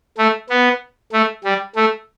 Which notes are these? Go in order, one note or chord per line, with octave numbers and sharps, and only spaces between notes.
A3
B3
A3
G3
A3